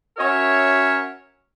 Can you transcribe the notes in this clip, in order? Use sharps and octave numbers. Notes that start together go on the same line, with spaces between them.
C#4 F#4 A#4 C#5 E5